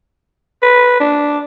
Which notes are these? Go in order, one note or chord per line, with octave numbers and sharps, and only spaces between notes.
B4
D4